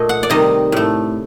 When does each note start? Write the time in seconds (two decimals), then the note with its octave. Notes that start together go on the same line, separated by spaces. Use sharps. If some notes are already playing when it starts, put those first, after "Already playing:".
Already playing: A#2 A3 D#5
0.09 F#5
0.23 D5
0.30 C3 D#3 G3 D#5
0.72 A2 A3